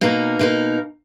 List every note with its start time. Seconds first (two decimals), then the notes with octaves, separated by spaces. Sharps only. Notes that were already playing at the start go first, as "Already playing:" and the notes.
0.01 B2 A#3 D#4 A#4
0.39 B2 A#3 D#4 A#4